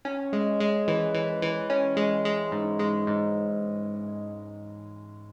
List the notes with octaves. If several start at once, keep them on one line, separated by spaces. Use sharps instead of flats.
C#4
G#3
G#3
E3
E3
E3
C#4
G#3
G#3
G#2
G#3
G#2